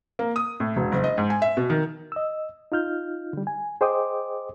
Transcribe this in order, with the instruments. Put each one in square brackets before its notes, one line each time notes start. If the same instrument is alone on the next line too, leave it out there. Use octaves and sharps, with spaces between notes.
[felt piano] A#3
D#6
A2
E1
F#1
D#5
G#2
G#5
E5
B2
D#3
[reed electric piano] D#5 E6
D#4 F4 F6 G6
D3 G3
G#5
G#4 C5 D#5 G5 D6 D#6